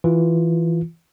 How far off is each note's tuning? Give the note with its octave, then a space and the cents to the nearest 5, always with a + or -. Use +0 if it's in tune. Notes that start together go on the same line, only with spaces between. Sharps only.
E3 +0 F4 +0